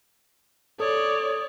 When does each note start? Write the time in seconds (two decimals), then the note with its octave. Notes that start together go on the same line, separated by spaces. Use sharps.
0.80 A4 C#5 D5 D#6